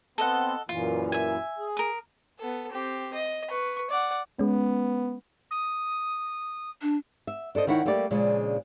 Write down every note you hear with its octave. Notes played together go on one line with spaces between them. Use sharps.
B3 C4 A4 D#5 F#5
F#2 A#2 E3 F4
E5 G#5
G#4
A#4 D#6
B3 A4
C4 G4
D#5
B4 C#6
D5 F#5
G#3 B3 C#4
D#6
D4
E5
D4 A4 C5 D#5
D#3 D#4 E4 C#5 F#5
G3 A3 A#3 G4 D5
A#2 C#3 F3 G#3 D4